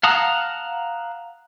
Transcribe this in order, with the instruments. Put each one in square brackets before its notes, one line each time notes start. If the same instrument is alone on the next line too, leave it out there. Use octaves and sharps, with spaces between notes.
[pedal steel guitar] F5 F#5 A5 A#5 D#6